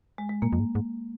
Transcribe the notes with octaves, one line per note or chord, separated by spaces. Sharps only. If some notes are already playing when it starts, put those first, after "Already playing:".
G#3
G#3
A#2 A#3
F2
G#2
G#2